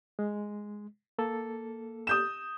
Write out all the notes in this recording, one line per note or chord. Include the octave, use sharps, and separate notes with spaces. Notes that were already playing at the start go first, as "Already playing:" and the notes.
G#3
A#3 A4
D#6 G6 E7